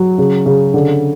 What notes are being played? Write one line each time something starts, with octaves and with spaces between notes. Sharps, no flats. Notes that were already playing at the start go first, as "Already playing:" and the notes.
Already playing: F#3
C#3
C#3
D3